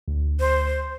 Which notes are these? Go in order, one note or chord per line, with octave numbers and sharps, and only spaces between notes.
D2
C5